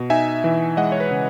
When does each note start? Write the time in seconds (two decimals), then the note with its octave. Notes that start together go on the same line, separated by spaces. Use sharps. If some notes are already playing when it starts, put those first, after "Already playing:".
Already playing: B2
0.10 D#4 E5 G#5
0.44 E3
0.77 G#3 D#5 F#5
0.92 C#5
1.00 B4
1.11 C#3